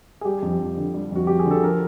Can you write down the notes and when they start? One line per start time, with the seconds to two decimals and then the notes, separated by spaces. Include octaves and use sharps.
0.21 G#4
0.25 G3 G4
0.42 F2
0.59 F2
0.77 D3
0.94 G3
1.12 F2 F#4
1.27 F2 G4
1.39 G#4
1.45 D3
1.51 A4
1.63 F3 A#4